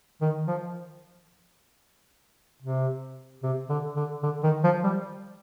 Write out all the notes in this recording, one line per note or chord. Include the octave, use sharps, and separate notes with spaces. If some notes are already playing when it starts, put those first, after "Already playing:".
D#3
F3
C3
C3
D3
D3
D3
D#3
F3
G3